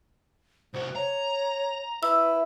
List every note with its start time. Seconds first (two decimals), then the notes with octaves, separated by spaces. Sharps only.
0.74 C2 F#4 C5
0.96 C#5 A#5
2.03 E4 B4 E6